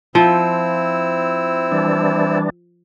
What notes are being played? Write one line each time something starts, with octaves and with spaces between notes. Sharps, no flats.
F3 C4 E4 E6
E3 G3 D4